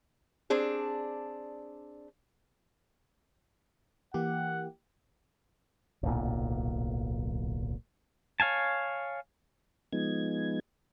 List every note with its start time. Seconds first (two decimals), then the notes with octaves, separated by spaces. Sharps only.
0.50 C4 D4 G#4
4.14 E3 A#3 G4 F#5
6.03 D1 B1 A#2
8.40 C#5 F5 G#5 A5
9.93 F3 G#3 B3 D#4 G#6